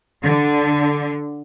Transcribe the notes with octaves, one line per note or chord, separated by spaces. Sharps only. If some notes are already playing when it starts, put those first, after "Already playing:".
D3